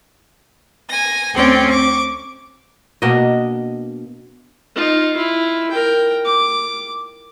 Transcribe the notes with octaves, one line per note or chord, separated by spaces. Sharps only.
G#5 A#6
D2 C4 C#4 D5 G5
C#6 D6
B2 A#3 D4 D#5
D#4 F4
E4 F4
A#4 G5
D6